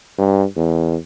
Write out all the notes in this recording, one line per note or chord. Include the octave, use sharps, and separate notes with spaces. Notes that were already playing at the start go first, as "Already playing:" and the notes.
G2
E2